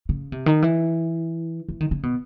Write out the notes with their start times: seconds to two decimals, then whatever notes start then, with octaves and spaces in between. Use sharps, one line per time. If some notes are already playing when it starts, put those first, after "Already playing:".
0.09 C#3
0.32 C3
0.46 D#3
0.62 E3
1.69 E3
1.81 D#3
1.91 C#3
2.03 B2